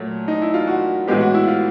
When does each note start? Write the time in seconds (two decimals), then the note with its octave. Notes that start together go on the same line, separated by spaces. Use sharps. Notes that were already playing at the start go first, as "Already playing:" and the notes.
Already playing: A#2 F#3 A3
0.28 D#4
0.42 E4
0.54 F4
0.67 F#4
1.08 A2 E3 G#3 B3 G4
1.21 F#4
1.34 E4
1.48 F4